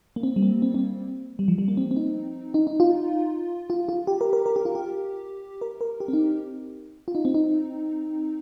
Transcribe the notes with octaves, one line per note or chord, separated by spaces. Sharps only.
A#3
C4
G3
A#3
C4
C4
G3
F3
G3
A#3
C4
C4
D#4
D#4
D#4
F4
F4
F4
G4
A#4
A#4
A#4
G4
F4
G4
A#4
A#4
G4
C4
D#4
F4
D#4
C4
D#4